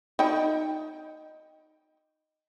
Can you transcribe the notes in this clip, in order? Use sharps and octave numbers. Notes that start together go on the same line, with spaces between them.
D#4 G5